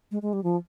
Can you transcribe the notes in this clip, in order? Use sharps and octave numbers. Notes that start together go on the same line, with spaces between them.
G#3
G#3
G3
F3